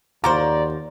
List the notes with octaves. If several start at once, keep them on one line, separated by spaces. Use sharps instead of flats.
D#2 F4 F#4 C5 D5 A#5